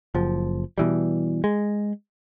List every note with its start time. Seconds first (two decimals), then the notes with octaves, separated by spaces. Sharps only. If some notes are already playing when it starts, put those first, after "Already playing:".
0.15 F#1 F3
0.78 B2 E3 G3
1.44 G#3